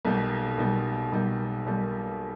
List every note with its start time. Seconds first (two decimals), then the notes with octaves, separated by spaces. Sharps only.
0.05 B1 B2 G3 A#3
0.58 B1 B2 G3 A#3
1.12 B1 B2 G3 A#3
1.66 B1 B2 G3 A#3